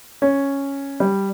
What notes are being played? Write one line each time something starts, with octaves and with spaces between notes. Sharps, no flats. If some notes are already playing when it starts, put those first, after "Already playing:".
C#4
G3